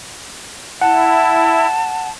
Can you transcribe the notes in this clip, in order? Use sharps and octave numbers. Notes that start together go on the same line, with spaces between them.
E4 F#5 A5